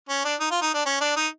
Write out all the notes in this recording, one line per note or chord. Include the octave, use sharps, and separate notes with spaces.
C#4
D4
D#4
F4
D#4
D4
C#4
D4
D#4